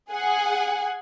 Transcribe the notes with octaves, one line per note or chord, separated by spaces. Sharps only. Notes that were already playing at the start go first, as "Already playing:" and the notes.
G#4 F#5 G#5